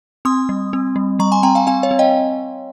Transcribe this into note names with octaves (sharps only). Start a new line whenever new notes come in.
C4 C6 D#6
G3
C4
G3
G3 A#5 C#6
G#5 C6
C4 G5 A#5
F5 G#5
C4 F5 G#5
C#5 F5
C4
D#5 G5